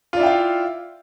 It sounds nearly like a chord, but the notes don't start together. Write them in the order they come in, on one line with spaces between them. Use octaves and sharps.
F4 D5 E4 G5 F5